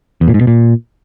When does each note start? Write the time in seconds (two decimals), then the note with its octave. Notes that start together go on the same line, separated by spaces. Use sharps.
0.21 E2
0.28 A#2
0.34 G#2
0.41 B2
0.47 A#2